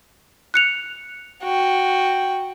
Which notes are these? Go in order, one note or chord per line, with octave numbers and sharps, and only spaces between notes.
F#6 C#7 F7
F#4 G5